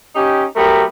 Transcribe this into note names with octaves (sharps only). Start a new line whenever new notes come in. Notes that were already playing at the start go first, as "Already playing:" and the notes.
C#4 D#4 G4
F#3 A3 B3 G4 A#4